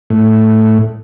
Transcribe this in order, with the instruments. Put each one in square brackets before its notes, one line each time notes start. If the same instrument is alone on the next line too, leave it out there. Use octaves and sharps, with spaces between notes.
[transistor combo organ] A2